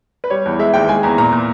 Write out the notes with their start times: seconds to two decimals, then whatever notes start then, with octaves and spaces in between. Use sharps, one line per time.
0.24 B4
0.30 G3 C#5
0.46 E2
0.59 G#3 E5
0.74 D#2 G5
0.89 G#3 G#5
1.03 E2 A#5
1.18 A#2 A#5
1.32 A#2